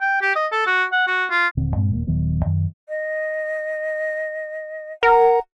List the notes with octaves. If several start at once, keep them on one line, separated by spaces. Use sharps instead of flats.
G5
G4
D#5
A4
F#4
F#5
F#4
F4
D#1 D3 C4
G2 A#2 G#3 C4
D#1 A#3
D#1 D#3 F#3 B3
F#2 D#3
D#5
A#4 F#5 A#5